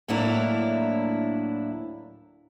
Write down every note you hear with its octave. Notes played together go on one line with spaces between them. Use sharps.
D2 A2 F#3 A#3 D4 E4